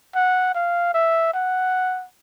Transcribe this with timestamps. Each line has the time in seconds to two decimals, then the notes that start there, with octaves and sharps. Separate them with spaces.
0.15 F#5
0.55 F5
0.94 E5
1.34 F#5